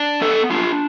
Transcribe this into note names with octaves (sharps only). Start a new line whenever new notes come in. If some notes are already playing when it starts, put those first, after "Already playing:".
Already playing: D4
B3 A4
D4 F4